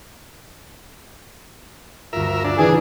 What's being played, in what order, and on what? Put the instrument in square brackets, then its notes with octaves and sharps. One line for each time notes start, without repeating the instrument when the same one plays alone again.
[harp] D2 G2 F4 [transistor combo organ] A#4 E5
[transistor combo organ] D4 [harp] E5 G#5 G#6
[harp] D2 A2 C#3 [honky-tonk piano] E3 [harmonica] G#4